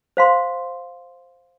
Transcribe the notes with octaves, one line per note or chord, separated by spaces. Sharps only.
C5 F5 C6